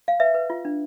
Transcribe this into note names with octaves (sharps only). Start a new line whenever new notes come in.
F5
B4 E5
B4
F4
D4